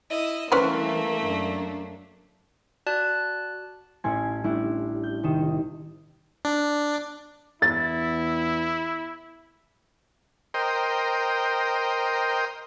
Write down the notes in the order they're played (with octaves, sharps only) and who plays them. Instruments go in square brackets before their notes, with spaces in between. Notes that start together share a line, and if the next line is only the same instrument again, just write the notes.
[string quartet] E4 D#5
[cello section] E3 G3 C4 [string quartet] A3 A#3 [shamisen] C#4 B4 C5
[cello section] F#2 D4
[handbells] F#4 D5 A5 F#6
[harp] A1 C#4 E4 A4 G#5 C6
G3 A3 C#4 D4 E4
G6
C2 D#3 E7
[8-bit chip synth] D4
[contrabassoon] E2 [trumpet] E4 [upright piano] A6
[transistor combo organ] A#4 C5 D#5 G5